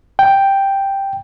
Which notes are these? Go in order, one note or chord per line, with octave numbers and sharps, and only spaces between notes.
G5